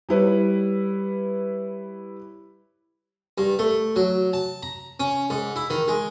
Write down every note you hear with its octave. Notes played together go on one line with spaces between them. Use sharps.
G3 E4 B4 C#5
G2
A3
F#3
A5
A#5
C#4
G#2
E4
D#3
G#3